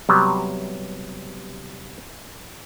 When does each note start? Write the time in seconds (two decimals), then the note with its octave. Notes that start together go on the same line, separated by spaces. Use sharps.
0.09 C3 F#3 G3 B3